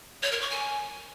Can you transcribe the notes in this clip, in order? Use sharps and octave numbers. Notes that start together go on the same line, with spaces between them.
C#5
A#4
C#6
G#5